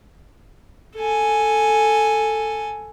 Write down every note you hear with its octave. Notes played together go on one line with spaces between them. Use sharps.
A4 G#5